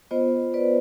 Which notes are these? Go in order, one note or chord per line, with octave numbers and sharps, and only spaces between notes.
B3 F4 C5 D#5
B4 D5